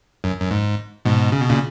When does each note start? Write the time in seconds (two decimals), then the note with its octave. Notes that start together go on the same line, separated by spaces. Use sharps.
0.24 F#2
0.40 F#2
0.50 G#2
1.05 G#2 B2
1.32 C#3
1.41 B2
1.50 A#2 C#3